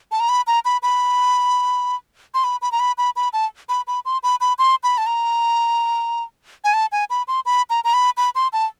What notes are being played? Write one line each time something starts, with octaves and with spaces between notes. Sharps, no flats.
A5
A#5
B5
A#5
B5
B5
C6
B5
B5
A#5
B5
B5
B5
A5
B5
B5
C6
B5
B5
C6
B5
A5
A#5
G#5
A5
G#5
B5
C6
B5
A#5
A#5
B5
B5
C6
A5